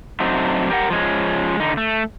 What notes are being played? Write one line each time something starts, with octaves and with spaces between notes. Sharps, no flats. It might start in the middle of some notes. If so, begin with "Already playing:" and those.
F#3 A3 C4 D4 D#4
G4 A#4 F#5
F3 G#3 C#4
D3 D#4
A3